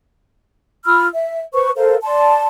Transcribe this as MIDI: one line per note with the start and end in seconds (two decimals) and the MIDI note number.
0.85 1.07 65
0.85 1.07 83
0.85 1.07 88
0.85 1.07 89
1.13 1.41 76
1.53 1.70 71
1.53 1.70 72
1.53 1.70 85
1.76 1.97 69
1.76 1.97 70
1.76 1.97 72
1.76 1.97 77
2.03 2.47 74
2.03 2.47 81
2.03 2.47 84